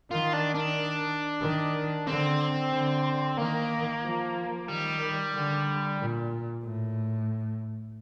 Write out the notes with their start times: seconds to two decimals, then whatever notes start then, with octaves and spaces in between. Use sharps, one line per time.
0.11 D#3 F4
0.33 D4
0.55 D4
1.42 D#3
2.07 D3 C4
2.73 D3
3.38 D#3 A#3
4.03 F3
4.68 D#3 G3
5.34 D3
5.99 A#2
6.64 A2